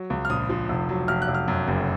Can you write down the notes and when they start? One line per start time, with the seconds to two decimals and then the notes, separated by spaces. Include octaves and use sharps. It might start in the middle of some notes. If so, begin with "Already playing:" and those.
Already playing: F#3
0.10 C#2
0.25 F6
0.30 A#1 D#6
0.49 F3
0.69 F1
0.89 F#3
1.08 F1 F6
1.22 F#6
1.28 F1
1.35 F6
1.48 F#2
1.68 F#1